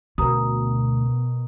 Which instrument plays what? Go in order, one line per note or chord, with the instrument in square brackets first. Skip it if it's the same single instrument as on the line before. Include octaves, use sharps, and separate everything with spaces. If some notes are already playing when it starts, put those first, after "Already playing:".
[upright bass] D2 [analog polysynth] B2 [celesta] A#4 A#5 D#6